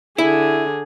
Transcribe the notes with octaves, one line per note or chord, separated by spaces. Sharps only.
D3 E4 G#4